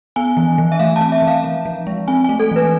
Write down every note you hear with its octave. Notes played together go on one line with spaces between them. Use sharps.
B3 G#5
E3
E3
E5
A3 F5
A5
C4
E5
E3
F5
F3
F3
G#3
C4 G#5
G#5
A3
A4
E3 B4